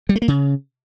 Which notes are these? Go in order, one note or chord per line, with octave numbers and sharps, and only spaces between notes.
G3
A3
A#3
C#3